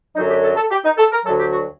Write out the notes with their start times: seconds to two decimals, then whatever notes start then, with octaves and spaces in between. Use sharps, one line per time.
0.15 F#2 D3 F#3 D#4
0.29 G4
0.43 A4
0.57 A4
0.70 G4
0.84 D#4
0.97 A4
1.12 A#4
1.25 D2 D3 F#3 A4
1.39 G4
1.53 F#4